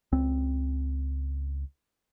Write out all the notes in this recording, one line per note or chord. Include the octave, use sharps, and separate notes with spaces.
C#2 C4